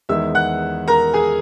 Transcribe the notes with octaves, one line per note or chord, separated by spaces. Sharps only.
E2 D#3 G#3 E5 E6
F#5 F#6
A#4 A#5
G#4 G#5